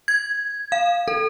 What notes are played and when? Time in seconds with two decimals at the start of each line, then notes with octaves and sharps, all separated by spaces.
0.08 G#6
0.72 F5
1.08 A4